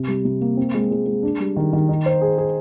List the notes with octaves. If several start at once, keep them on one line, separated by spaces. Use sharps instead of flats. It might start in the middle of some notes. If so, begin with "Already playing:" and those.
Already playing: C3
G3
C3
A#3
C4
G#3
G#3
G#3
D4
G3
D#3
D#3
D#4
C5
G#4
G#4